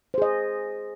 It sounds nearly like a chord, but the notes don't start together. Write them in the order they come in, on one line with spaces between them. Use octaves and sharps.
C5 G#4 D#5